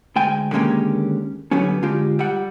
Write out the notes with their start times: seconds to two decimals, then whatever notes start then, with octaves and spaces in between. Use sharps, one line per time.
0.16 D2 G#3 G5 G#5
0.52 D3 D#3 G#3 A#3 C#4 G4
1.51 D3 F#3 G3 B3 C#4
1.82 D3 G#3 F4 G4
2.19 G3 F#5